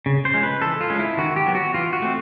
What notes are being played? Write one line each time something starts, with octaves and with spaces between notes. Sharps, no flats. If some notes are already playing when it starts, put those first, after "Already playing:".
C#3
C5
F3 G#3 C#4
B4
E3 A4
F4
G#3 C#4
E4
D#3 F#4
G4
F#3 B3
F#4
E3 F4
F#4
A3 C4